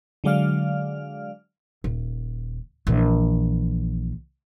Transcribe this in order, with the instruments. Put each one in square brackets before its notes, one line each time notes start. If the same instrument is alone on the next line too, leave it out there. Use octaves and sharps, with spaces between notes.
[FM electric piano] D3 F#3 G#3 D5 F5 F6
[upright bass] D#1
A#1 E3